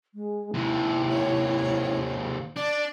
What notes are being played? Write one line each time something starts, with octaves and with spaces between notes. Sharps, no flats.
G#3
D#2 C3 E4
C#5
D4 D5